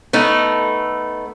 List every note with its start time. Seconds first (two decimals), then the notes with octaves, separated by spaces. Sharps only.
0.13 A3 B3 D#4